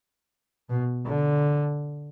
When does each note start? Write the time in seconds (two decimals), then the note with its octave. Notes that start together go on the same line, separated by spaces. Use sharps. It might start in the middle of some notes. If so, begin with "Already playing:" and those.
0.69 B2
1.06 D3